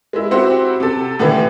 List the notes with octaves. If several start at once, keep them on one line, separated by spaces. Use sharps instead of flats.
G#3 E4
C4 E4 F#4 G4 C5 F#5
C3 A4
A2 D3 E3 A3 G4